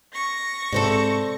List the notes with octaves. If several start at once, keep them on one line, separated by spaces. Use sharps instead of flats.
C#6 A#6
G#2 C3 A4 C5 D5